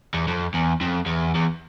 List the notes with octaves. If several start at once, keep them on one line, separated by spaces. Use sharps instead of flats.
E2
F2
E2
F2
E2
E2